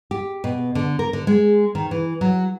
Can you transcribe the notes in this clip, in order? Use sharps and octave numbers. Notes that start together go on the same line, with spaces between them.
G4
B2
D3
A#4
D3
G#3
D#3
E3
F#3